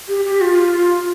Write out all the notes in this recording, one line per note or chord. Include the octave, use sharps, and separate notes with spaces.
G4
G4
F4